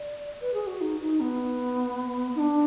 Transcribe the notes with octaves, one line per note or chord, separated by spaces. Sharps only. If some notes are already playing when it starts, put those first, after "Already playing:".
Already playing: D5
B4
G#4
F#4
D#4
D#4
B3
D#4
D4